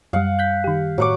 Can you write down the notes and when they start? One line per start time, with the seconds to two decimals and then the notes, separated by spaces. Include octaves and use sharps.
0.13 F#2 G3 F5 F#5
0.39 F#6 G6 B6
0.64 D#3 G4
0.98 A2 F#3 F#5 C#6 D6